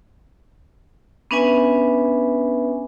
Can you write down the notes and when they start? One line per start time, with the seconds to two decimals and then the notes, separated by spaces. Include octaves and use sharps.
1.31 B3 C#4 D4 B4 E5 G#5